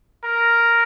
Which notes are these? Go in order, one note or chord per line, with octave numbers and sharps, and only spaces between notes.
A#4